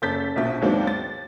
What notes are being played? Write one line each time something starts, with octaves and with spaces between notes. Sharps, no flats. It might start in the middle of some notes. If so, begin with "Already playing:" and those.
F#1 A4 G6 A6 B6
A#1 B2 E5
D#2 G#2 F#3 B3 C4 D4
A6